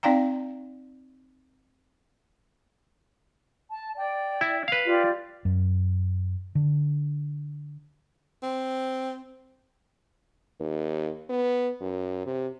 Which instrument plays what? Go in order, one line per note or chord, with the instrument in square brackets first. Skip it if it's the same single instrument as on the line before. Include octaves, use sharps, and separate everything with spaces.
[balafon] C4 D#4 D5 F5 G5 A#5
[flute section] A5
D5 G5
[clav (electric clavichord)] E4
B4 F5
[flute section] F4 G4 D5
[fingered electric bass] F#2
D3
[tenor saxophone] C4
[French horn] D#2
B3
F#2
C3